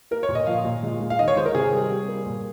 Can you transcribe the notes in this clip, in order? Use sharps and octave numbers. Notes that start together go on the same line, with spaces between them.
A#3 A#4
C#5
A#2
D#5
F3 F5
A#2
G#3
G#3
F5
D#3 D#5
C#5
G#3 C5
A#4
C3 G#4
G3
G3
A#3
A#2